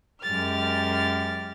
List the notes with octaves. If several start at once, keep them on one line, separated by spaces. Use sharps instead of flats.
F#2 G#3 G4 A#4 F6 A6